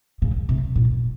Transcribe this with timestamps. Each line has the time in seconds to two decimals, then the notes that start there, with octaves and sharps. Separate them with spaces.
0.22 C#3
0.49 C3
0.75 A#2